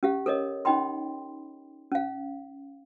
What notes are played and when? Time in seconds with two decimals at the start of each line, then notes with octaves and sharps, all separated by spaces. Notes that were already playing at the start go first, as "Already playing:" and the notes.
0.03 C#4 G4 F5
0.26 A4 A#4 C#5 D#5
0.65 C#4 D#4 D#5 G5 B5 C6
1.92 C#4 F5